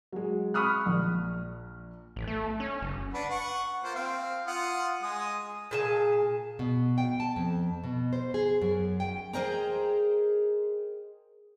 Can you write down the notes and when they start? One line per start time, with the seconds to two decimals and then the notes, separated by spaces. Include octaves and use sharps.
0.12 F#3 G#3
0.54 B5 C#6 D#6 F6 F#6
0.86 A#1
2.16 A1
2.28 A3
2.60 C#4
2.81 F#1
3.14 D4 B4 F#5
3.29 F#5 C#6
3.84 A#3 F4 C5
3.95 C4 F5
4.47 F4 F#5 D#6
5.03 G#3 D#6
5.71 A#2 G#4 A5
6.59 B2
6.98 G5
7.20 A5
7.36 F2
7.84 B2
8.13 C5
8.34 G#4
8.62 F#2
9.00 G5
9.33 G#4 A#4 C5 D#5 G5 A#5